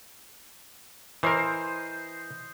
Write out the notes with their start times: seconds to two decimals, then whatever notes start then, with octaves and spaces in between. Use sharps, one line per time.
1.23 E3 A#4 C5 D#5 C6